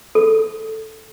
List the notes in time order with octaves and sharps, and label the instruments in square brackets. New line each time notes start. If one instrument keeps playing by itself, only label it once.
[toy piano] A4